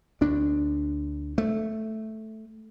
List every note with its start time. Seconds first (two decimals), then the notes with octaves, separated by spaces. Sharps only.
0.21 D2 D4
1.38 A3